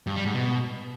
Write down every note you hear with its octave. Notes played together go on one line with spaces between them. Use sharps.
G2
G3
G#2
B2